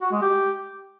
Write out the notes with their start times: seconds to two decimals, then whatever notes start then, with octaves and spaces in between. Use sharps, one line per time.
0.02 F#4
0.12 G#3
0.22 G4